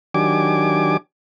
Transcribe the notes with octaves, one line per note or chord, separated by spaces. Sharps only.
D#3 F#3 D4 G4 G#5 D6